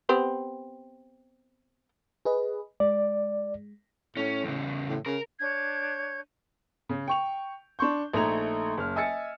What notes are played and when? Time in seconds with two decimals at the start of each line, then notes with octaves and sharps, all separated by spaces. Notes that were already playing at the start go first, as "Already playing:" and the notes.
0.09 B3 C4 G4
2.25 G#4 B4 D#5
2.80 G#3 D5
4.17 A2 C#4
4.44 E2 C#3
4.89 A2
5.06 C#3 A#4
5.40 D4 C#5 G6 G#6
6.89 C#3
7.08 G5 C#6 F7
7.79 D4 C6 C#6 G6
8.14 A#1 A3 D#4 A#5 G#6 F7
8.77 F#1 F6
8.96 D#5 E5 G#5 E6 A6 C#7